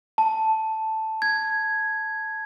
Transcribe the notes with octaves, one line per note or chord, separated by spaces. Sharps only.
A5
G#6